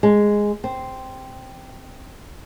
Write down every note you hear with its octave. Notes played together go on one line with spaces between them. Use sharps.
G#3
C4